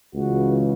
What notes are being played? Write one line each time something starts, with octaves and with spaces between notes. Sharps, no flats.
C#2 C#3 E3 F#4